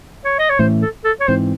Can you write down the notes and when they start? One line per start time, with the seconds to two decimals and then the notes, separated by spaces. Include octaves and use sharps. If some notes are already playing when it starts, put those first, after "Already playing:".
0.24 C#5
0.39 D#5
0.49 C#5
0.59 A2 E3 A3 C#4 C5
0.82 A4
1.04 A4
1.20 C#5
1.28 G#2 E3 C4 C5